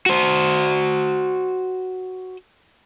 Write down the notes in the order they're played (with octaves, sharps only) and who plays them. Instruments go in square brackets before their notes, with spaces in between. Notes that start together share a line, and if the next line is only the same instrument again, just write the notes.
[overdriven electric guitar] F#4 C5